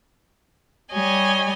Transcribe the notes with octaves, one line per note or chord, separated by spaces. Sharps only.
G3 C#5 D#5 G#5